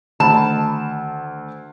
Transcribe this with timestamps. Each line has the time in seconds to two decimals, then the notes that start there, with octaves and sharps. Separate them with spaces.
0.20 D2 D#3 A5